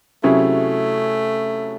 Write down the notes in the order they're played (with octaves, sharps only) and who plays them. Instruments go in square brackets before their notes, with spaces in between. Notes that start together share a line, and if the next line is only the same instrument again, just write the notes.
[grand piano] C3 F#3 C#4 E4 G#4 [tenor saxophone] A3